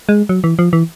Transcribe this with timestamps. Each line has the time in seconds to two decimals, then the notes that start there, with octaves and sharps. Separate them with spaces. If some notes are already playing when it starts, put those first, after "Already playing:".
0.09 G#3
0.29 F#3
0.44 E3
0.59 F3
0.73 E3